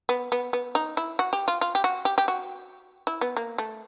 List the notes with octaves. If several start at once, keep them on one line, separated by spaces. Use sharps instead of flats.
B3
B3
B3
D#4
E4
F#4
G4
F4
F4
G4
F#4
G4
G4
F#4
E4
B3
A#3
A3